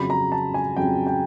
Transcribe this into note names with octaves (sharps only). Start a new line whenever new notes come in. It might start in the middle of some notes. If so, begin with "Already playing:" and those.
Already playing: F2 C#3 F#3 B5
A#5
A5
G#5
F2 C#3 F#3 G5
G5